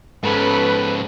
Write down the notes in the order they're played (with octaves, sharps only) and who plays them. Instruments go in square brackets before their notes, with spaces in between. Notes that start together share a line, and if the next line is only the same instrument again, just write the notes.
[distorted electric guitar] G#2 C#4 [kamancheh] A4 B5 [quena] B4